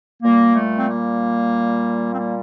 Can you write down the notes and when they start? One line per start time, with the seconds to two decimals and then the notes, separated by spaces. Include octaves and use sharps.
0.22 A#2 G3 A#3
0.54 A3
0.77 C4
0.87 A#3
2.11 C4
2.17 A#3